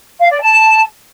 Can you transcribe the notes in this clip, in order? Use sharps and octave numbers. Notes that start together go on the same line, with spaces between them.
F5
D5
A5